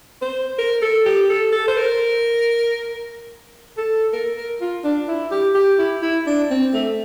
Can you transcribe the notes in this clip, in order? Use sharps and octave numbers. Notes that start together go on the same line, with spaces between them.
C5
A#4
A4
G4
A4
A4
C5
A#4
A4
A#4
A#4
F4
D4
E4
G4
G4
E4
E4
D4
C4
A3